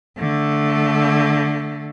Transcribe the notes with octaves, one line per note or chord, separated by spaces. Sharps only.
D3 A3